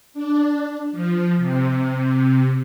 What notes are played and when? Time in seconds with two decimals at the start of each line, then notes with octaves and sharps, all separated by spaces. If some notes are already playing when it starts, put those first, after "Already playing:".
0.14 D4
0.92 F3
1.38 C3